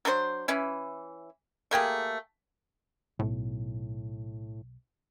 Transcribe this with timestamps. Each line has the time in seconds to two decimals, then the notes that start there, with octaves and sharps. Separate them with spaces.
0.05 F#3 D4 A4 C5
0.48 E3 C#4 E4
1.71 A3 A#3 G4 G#4
3.19 B1 A2